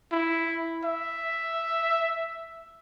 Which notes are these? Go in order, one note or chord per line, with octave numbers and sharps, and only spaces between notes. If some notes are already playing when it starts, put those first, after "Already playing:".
E4
E5